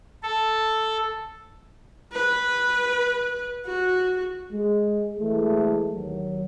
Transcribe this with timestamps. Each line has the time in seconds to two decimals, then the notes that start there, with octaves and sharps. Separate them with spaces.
0.23 A4
2.13 B4
3.66 F#4
4.51 G#3
5.20 E3 G#3 A3
5.92 D#2 F#3